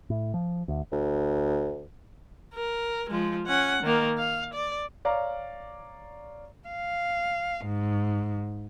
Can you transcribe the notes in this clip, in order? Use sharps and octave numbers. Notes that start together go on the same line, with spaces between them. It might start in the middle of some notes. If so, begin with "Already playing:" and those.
A2
F3
D2
D2
A#4
F3 G#3
C#4 F#5
D#3 A#3
F5
D5
C#5 D5 F5 A#5
F5
G#2